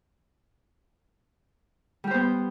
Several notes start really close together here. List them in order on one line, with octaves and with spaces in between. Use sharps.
G3 G4 C5 B3